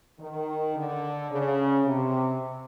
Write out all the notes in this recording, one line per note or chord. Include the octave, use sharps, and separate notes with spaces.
D#3
D3
C#3
C3